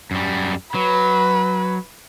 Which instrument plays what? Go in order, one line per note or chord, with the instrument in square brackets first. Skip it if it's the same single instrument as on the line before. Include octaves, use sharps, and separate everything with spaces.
[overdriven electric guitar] F#2 G3
[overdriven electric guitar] F#3 [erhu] B4